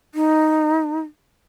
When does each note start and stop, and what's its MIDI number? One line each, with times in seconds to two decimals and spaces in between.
0.15 1.00 63